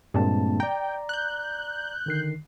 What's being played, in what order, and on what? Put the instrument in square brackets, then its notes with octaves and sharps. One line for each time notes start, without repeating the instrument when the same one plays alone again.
[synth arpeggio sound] G2 A#2 D3 [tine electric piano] G#3 C4 A5
[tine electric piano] D5 A#5 [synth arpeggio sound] G5
[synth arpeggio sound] F#6 G6
[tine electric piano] D3 D#3 C7